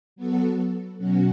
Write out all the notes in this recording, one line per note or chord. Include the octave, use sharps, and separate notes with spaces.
F#3 B3 F#4 A4
B2 F#3 C#4 F#4